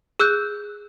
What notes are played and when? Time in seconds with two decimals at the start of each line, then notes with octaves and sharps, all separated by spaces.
0.19 G#4 E6 F#6 G6